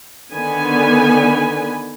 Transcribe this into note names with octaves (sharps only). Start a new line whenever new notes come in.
D3 D#3 B3 G#5 B5